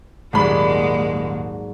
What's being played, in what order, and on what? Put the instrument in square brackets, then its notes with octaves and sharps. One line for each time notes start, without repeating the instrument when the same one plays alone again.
[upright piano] D#1 B5 [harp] G#2 F#3 D5 [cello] G#3 A#3